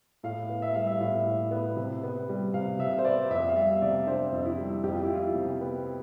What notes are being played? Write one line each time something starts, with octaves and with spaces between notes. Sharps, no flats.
A2 F5
B3
E5
G3 F5
E5
A2 E5
A2
B3
C3
B3
G3
C3 F5
C3 E5
C5
B3 D5
F2 E5
F5
G3 E5
C3 D5
D4 C5
F2
E4
G3
F2 G4
F4
E4
F3
F4
C3
B3